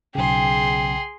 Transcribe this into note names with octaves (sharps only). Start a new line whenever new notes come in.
B1 C#3 G#4 G5 C6